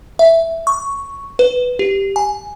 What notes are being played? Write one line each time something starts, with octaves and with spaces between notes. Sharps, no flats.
E5
C#6
B4
G4
G#5